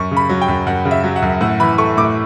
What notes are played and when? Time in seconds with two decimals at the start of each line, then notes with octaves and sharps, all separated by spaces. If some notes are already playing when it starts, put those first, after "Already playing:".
Already playing: F#2 C#6
0.11 C#3
0.17 B5
0.29 F#3
0.41 G5
0.48 F#2
0.67 F#2 F#5
0.85 C#3
0.91 E5
1.04 F#3
1.16 F#5
1.22 F#2
1.41 A2 F#5
1.60 E3 B5
1.78 A3 C#6
1.97 A2 D6